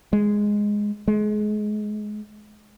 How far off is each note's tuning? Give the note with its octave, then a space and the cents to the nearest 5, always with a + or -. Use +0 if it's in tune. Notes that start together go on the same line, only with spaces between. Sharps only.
G#3 -5
G#3 +25